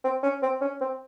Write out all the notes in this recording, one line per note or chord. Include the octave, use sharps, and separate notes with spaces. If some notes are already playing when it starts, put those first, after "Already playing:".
C4
C#4
C4
C#4
C4